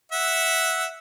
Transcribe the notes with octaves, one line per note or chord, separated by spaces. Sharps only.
E5 F#5